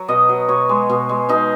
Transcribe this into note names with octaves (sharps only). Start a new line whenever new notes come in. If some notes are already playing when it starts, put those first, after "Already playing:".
Already playing: F#3
B2 D#5
F#3
B2 C#5
G#3
B2
G#3
B2 D#4